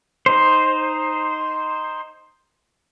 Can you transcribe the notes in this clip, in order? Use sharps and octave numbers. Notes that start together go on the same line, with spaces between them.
D#4 C5